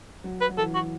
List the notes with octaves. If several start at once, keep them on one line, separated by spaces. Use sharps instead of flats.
F#3
B4
F#3
E3 A4
F#4